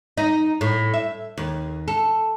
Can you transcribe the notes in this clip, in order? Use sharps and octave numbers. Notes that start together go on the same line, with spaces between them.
D#4
A2
E5
D#2
A4